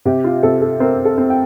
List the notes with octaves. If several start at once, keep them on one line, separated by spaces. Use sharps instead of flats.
C3 G4
F4
C3 A4
A4
C4 A#4
A4
C4
G5